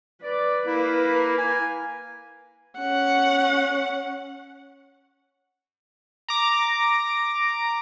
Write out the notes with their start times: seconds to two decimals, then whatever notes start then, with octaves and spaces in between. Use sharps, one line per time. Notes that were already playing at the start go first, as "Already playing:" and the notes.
0.23 B4 D5
0.66 A#3 E4
1.38 G#5
2.79 C#4 F#5
6.28 A#5 D6